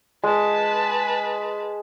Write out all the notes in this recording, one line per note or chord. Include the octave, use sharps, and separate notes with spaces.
G#3 B4 A5